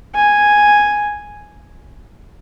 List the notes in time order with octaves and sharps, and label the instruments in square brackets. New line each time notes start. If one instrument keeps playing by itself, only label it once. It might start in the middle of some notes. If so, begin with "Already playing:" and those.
[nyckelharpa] G#5